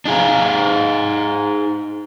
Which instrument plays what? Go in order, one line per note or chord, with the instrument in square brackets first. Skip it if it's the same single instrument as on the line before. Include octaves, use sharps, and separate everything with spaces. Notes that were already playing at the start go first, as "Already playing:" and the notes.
[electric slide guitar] D4 D#4 G#4 F5 A#5